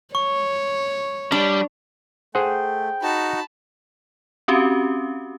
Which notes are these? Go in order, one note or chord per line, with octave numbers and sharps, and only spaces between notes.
C#5 C#6
G3 D4
A3 G#4 C5 F#5 G5
D#4 F#4 A5 B5
C4 C#4 F#4 G4